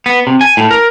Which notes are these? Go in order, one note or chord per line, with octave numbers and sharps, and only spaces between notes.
B3
C3
G#5
A2
A#4